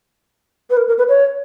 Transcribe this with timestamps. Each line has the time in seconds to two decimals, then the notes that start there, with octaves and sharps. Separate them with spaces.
0.70 B4
0.77 A#4
0.88 A#4
0.98 B4
1.09 C#5